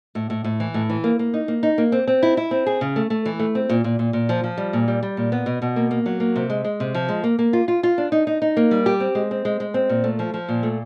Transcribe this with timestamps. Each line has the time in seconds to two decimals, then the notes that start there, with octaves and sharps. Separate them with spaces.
0.15 A2
0.30 A2
0.44 A2
0.60 E3
0.74 A2
0.89 E3
1.04 A#3
1.19 A#3
1.34 D#4
1.48 A#3
1.63 D#4
1.78 A#3
1.92 C4
2.07 C4
2.23 E4
2.37 E4
2.51 C4
2.66 G#4
2.81 C#3
2.96 A3
3.10 A3
3.25 E3
3.39 A3
3.55 C4
3.69 A#2
3.84 A#2
3.99 A#2
4.13 A#2
4.29 F3
4.44 F3
4.58 G3
4.73 A#2
4.88 G3
5.03 G3
5.17 A#2
5.32 B3
5.46 B2
5.62 B2
5.76 A#3
5.91 A#3
6.06 F#3
6.20 A#3
6.36 C3
6.50 G#3
6.65 G#3
6.80 C3
6.95 F3
7.09 G#3
7.24 A#3
7.39 A#3
7.53 F4
7.68 F4
7.83 F4
7.98 D4
8.12 D#4
8.27 D#4
8.42 D#4
8.57 A#3
8.71 G3
8.86 G4
9.00 C4
9.15 G#3
9.31 C4
9.45 G#3
9.60 G#3
9.74 C4
9.89 A#2
10.04 A3
10.19 F3
10.34 F3
10.49 A#2
10.63 A3